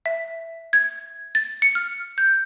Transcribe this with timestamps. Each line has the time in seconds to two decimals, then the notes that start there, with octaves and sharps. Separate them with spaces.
0.06 E5
0.73 G#6
1.35 A6
1.62 C#7
1.75 F6
2.18 G6